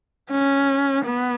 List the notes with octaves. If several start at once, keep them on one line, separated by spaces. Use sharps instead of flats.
C#4
B3